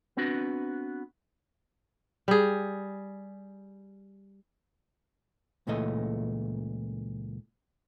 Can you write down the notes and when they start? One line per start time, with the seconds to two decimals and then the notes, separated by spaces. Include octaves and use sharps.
0.17 B3 C4 D4 F#4 B4
2.28 G3 G#4
5.67 C#2 A#2 E3 A3 D#5